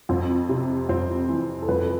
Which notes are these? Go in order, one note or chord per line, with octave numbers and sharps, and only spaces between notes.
F2 C4
C3
F2 C4
E3
A4
F2 B4
A4